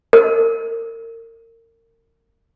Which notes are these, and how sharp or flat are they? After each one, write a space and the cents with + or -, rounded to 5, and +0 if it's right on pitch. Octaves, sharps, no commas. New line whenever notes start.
A#4 -30